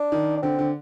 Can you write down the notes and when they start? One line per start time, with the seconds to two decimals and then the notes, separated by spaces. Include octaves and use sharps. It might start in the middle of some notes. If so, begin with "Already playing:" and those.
Already playing: D4
0.12 D#3
0.37 D4
0.42 D3 C4
0.59 D3